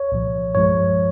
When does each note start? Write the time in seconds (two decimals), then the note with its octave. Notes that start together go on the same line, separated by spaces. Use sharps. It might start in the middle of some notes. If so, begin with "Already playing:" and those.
Already playing: C#5
0.12 C2 A#2 F3
0.55 G2 F3 G#3 C#5